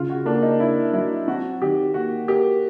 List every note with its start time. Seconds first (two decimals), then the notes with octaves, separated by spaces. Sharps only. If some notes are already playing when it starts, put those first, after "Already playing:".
Already playing: C#3 F4
0.10 F#4
0.25 A#3 D4
0.42 D#4
0.59 D4 E4
0.93 F#3 E4
1.28 C4 F#4
1.62 D#3 G4
1.94 A#3 F#4
2.28 G4 A#4